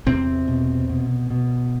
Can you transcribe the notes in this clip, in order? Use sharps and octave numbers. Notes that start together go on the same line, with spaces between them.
E2 C3 C4
B2
B2
B2